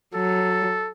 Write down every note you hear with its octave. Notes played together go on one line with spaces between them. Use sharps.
F#3 A4